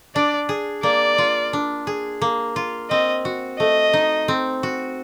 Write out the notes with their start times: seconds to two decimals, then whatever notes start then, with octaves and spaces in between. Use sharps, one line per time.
0.16 D4 D5
0.49 G#4
0.83 A#3 D5
1.18 F4
1.53 D4
1.87 G#4
2.22 A#3
2.56 F4
2.90 C4 D#5
3.25 F#4
3.59 A3 D#5
3.93 D#4
4.28 C4
4.63 F#4